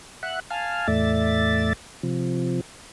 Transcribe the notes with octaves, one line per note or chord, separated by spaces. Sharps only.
E5 F#5 F#6
F5 G#5 A5 F6
E2 A2 A3 D5 E5 A6
C3 F3